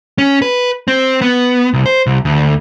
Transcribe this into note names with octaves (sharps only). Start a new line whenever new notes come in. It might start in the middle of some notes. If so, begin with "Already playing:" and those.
C#4
B4
C4
B3
C2
C5
C2
D2